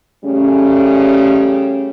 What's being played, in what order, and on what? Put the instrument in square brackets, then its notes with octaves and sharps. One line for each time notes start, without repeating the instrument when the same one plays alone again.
[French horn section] C#3 G3 A3 C#4